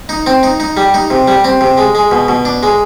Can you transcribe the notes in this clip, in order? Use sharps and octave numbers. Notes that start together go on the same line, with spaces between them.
D#4
C4
D#4
D#4
G3
D#4
C3
G3
C4
C3
G#3
G#3
B2
B2
D4
G#3